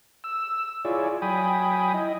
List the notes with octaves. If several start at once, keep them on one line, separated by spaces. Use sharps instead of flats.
E6
E4 F4 G#4 C#5 D5
F#3 G5 G#5 B5 D#6
E4 D#5